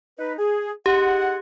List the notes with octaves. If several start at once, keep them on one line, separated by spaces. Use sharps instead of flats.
D#4 B4
G#4
D#4 G4 G#4 F#5